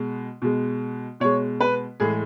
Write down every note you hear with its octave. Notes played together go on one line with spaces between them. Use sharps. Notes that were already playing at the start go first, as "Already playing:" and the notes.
Already playing: B2 G#3
B2 G#3
B2 G#3 C#5
B4
A2 E3 G#3 G#4